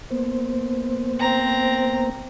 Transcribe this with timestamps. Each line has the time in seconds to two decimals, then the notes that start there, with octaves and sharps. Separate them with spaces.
0.10 A#3 B3 C5
1.19 C4 A#5